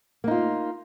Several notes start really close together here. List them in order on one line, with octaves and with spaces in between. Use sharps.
A#3 D#4 F4